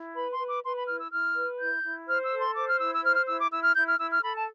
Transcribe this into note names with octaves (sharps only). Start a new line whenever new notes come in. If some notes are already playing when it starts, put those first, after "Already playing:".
Already playing: E4
B4 B5
C6
B4
D6
B4 C6
B5
E4 F6
E6
E4 F6
B4
E4 G6
E4
C5 F6
E6
A4
C6
C5 D6
F6
E4 E6
E6
C5 F6
F6
E4 E6
D6
E4 E6
F6
E4 G6
F6
E4 E6
F6
A4 B5
A5